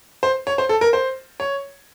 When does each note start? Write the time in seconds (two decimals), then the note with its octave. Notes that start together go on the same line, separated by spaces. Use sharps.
0.23 C5
0.47 C#5
0.58 C5
0.69 A4
0.81 A#4
0.93 C5
1.40 C#5